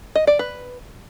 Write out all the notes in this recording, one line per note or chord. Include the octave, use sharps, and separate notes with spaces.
D#5
D5
B4